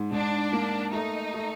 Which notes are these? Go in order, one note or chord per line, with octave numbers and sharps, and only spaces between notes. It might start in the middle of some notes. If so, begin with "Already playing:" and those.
Already playing: G#2
G#2 D4
A#3
A3 D#4
A3